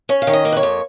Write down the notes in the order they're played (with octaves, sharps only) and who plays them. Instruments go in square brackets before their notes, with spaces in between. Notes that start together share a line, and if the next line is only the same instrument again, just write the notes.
[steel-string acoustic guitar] C#4 C#5
F5
D#3
D#5
A#3
B4
C#5
F2